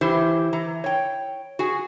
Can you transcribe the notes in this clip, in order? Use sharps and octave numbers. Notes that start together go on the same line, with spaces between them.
E3 E4 G4 C5
E3 A#5
C#5 G5
F#4 G#4 G#5